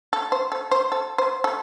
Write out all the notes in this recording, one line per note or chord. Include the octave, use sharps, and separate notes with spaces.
A4
C5
A4
C5
A4
C5
A4